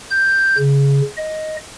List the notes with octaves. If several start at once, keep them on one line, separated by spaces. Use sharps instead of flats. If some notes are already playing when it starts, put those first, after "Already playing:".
G6
C#3
D#5